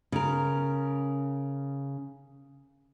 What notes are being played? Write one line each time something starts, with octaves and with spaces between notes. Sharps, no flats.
C#3 A#4